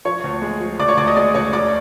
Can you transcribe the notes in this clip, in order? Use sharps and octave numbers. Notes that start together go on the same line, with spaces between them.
F3 C#5 C#6
D2
G#3
F3
D2 D5 D6
C#5 C#6
D2 D5 D6
D#5 D#6
G#3 D5 D6
D2 C#5 C#6
E1 D5 D6